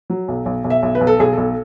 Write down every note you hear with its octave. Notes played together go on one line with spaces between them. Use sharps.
F#3
B1
B1
B1
E5
B1
B4
B1
A4
B1 G#4
B1 A4